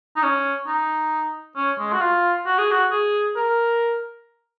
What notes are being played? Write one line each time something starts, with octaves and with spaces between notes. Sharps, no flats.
D#4
C#4
D#4
C#4
G#3
F#4
F4
F#4
G#4
F#4
G#4
A#4